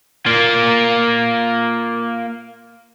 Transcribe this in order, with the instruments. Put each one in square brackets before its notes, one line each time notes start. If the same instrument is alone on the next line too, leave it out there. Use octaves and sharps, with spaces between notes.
[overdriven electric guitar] A#3 F4